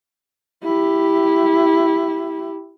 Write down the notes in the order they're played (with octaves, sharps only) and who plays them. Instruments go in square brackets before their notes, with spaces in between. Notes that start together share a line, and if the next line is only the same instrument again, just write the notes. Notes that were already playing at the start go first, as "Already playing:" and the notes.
[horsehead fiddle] E4 G4